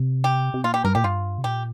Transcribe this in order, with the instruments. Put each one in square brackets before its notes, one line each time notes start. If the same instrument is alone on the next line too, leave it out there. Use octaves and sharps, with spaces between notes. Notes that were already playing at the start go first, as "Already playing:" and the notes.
Already playing: [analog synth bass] C3
[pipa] G4
[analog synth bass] C3
[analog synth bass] A#2 [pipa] F4
[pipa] G4
[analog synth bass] G2 [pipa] A#4
[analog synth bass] A#2 [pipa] G4
[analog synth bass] G2 [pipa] F4
[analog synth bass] C3
[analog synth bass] A#2 [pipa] G4